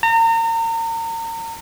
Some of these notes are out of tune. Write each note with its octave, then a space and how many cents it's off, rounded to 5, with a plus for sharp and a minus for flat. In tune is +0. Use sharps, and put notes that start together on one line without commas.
A#5 -35